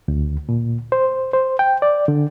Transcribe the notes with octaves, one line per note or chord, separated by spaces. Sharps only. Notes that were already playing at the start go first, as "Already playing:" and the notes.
D2
A#2
C5
C5
G5
D5
D3